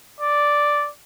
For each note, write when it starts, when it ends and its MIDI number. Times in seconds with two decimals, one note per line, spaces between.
0.20 0.89 74